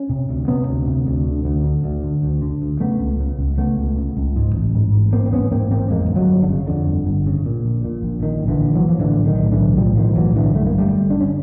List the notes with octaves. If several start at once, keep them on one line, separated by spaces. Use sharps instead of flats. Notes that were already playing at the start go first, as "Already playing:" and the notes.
Already playing: C#4
C3
D2
C3 B3 C#4
D2
C3
D2
D3
D2
D3
D2
D3
D2
D3
D2
C#3 A3 B3
C#2
C#3
C#2
C#3 A3 B3
C#2
C#3
C#2
G#2
A1
G#2
A1
G#2 A#3 C4
C4
A1 B3 C#4
G#2 A#3 C4
A1 A#3 C4
F2 G#3 A#3
G1
F#3 G#3
G1
D3
C#3
F2 D3
G1
G1
C#3
A#2
A#1
A#2
A#1
A#2 D#3
A#1
D3 E3
A#2
E3 F#3
A#1
F3
A2 D3 E3
B1
D#3
A2
D3 E3
B1
A2 F3 G3
B1 D#3 F3
A2 E3 F#3
B1 D3 E3
G2 A3
A#3
G1 G3 A3
G1
D3 D4
C#4